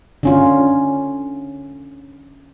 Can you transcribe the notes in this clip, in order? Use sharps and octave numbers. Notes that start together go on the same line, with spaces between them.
D3 C#4 F4